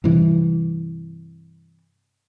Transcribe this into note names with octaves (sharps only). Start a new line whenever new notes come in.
G2 C3 E3